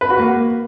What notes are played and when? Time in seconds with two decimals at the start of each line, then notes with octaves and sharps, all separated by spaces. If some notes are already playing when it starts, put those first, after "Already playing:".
0.01 B4
0.10 F#4
0.19 A#3